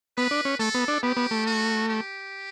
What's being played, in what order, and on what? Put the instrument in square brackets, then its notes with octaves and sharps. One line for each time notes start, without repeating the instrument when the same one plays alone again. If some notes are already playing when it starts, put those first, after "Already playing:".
[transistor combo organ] B3 [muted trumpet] B4
[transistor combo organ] D4
C#4
[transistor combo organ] A3 [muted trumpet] A4
[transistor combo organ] B3
D4
[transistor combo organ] B3 [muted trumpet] G4
[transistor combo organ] B3
A3
[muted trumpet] F#4
G4